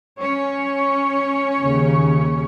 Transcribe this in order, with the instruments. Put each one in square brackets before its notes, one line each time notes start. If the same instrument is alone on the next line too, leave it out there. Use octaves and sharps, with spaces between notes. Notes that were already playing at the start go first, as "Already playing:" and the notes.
[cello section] C#4 C#5
[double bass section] D#2 C#3